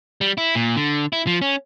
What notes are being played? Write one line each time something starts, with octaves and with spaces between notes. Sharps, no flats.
G3
E4
A#2
D3
E4
F3
C#4